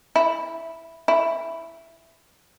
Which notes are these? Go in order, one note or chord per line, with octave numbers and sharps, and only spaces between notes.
E4
E4